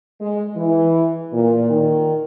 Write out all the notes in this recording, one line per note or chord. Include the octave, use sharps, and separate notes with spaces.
G#3
E3
A#2
D#3